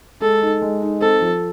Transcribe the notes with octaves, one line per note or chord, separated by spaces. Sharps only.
G#3 A4
D#4
G#3
D#4
C4 A4
F3